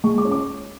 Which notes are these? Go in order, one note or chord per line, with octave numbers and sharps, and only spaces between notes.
G#3 C#6
D6
C#4
D6